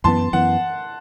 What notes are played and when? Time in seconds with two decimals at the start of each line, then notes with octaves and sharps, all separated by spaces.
0.04 F#2 E3 B3 A5 C6
0.33 F#2 E3 B3 F#5